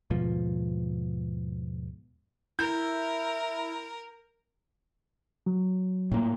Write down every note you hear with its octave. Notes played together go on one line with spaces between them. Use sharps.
D#2 G#2 B2 F3
E4 A#4 G6
F#3
A2 A#3